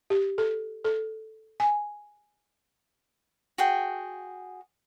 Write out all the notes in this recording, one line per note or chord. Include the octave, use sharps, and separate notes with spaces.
G4
A4
A4
G#5
F#4 G#4 G5